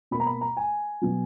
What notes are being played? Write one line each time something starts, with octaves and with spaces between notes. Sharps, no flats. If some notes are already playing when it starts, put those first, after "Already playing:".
B2 A#3 B5
A#5
B5
A#5
G#5
B2 F#3